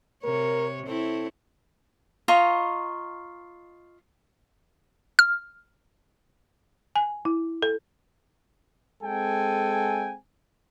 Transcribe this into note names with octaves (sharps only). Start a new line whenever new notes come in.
C3 A#4 C#5
C4 E4 A4 C#5
F4 D#5 A#5 C#6
F6
G#5
E4
A4
G#3 C4 A4 G5 G#5